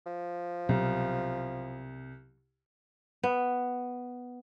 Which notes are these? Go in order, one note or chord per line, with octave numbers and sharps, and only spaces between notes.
F3
C2 B2 F#3
B3